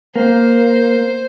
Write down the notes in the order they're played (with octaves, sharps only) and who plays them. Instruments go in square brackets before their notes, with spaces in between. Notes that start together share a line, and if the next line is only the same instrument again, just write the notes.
[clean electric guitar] A#3 [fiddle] C5